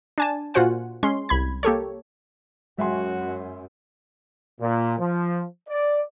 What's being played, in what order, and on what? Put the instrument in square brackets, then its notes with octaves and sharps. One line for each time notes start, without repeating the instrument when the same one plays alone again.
[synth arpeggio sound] D4 G#5 A5
A#2 F4 F#4 C5 F#5 G#5
G#3 C#4 C6
C2 B5 G#6
A#3 G4 A4 C#5
[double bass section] F#2 [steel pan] G#3 G5 [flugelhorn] F#4 [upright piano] E5 G#5 C6
[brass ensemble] A#2
F3
D5